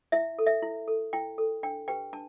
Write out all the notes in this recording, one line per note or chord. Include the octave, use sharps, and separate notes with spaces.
E4 E5
A4
E5
E4
A4
E4 G5
A4
D4 G5
G4 B4 G5
D4 A5